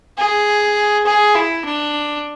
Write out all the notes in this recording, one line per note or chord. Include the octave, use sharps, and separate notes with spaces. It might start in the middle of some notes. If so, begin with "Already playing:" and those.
G#4
G#4
E4
D4